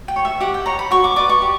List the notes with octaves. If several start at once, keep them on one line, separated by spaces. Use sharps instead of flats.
G5
C#5
E5
G4 F#5
G5
C#5 A#5
B5
F#4 C#6
D6
B4 D5 D6
C#6
G4